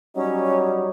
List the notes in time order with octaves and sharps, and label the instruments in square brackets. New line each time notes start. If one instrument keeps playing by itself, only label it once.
[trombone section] F#3 G3 D#4 [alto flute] C#4